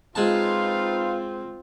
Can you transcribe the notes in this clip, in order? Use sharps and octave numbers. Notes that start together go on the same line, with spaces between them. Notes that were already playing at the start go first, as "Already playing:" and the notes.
G#3 C4 D#4 F4 B4 F5 A5